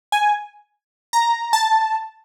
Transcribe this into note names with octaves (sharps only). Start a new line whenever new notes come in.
G#5
A#5
A5